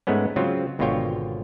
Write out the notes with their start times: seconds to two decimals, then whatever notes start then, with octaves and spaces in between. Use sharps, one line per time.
0.07 G#2 G#3 A3 B3 C#4
0.36 C#3 F#3 C4 F4
0.79 G#1 B2 D3 F4 C#5 G5